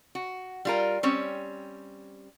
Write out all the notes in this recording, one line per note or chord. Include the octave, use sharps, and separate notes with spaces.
F#4
G3 F4 A#4
G3 C4 C#4 C#5